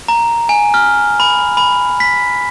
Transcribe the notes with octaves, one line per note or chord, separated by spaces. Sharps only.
A#5
G#5
F6
B5
B5
B6